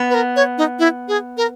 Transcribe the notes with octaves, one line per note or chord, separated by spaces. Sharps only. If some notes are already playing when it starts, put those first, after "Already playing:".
Already playing: B3
B4
A#4
C#5
D#4
E4
G#4
A#4